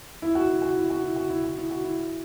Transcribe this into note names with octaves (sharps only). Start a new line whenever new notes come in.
E4
F#4
E4
F#4
E4
F#4
E4
F#4
E4
F#4
E4
F#4
E4